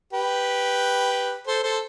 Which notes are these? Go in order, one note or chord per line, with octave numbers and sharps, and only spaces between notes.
G4 B4
A4 C5
A4 C5